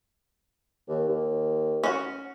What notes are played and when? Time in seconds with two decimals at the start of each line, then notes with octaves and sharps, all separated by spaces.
0.88 D#2
1.09 D#2
1.83 C#4 F#4